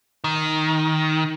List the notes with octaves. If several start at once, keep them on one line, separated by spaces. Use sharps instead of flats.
D#3